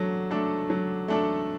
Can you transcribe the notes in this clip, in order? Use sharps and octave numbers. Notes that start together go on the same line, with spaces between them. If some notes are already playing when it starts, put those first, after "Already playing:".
Already playing: F#3 A3 D4 A4
A3 D4 A4
F#3
A3 D4 A4